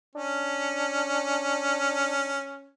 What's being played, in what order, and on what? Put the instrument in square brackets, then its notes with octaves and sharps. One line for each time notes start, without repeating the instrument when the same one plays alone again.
[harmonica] C#4 [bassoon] D4